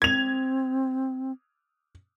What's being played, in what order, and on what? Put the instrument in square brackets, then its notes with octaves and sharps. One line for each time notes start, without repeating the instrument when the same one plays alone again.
[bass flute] C4 [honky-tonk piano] G#6 F7